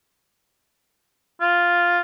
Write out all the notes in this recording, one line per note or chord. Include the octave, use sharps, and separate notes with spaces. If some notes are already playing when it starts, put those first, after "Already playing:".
F4